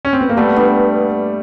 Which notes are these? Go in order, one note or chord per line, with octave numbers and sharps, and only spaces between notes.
C#4
C4
B3
A#3
G3 A3 B3
G2